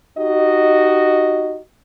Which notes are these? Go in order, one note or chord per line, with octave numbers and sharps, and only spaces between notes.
D#4 F#4 G4 D#5